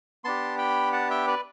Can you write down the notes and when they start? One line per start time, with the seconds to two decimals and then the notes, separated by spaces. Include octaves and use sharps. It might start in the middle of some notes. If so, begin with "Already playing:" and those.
0.24 B3 D4 G4 A5 C6
0.58 G5 B5
0.92 F#5 A5
1.10 E5 G5
1.27 B4 D5